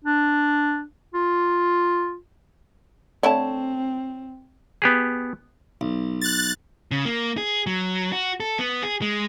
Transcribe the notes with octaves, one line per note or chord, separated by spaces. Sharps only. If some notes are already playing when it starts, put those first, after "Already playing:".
D4
F4
D3 A3 C4 E4 C#5 A5
B3 G4 G#4
B1
F#6 A6
C#3
A#3
G#4
F#3
F#4
A4
B3
G#4
G#3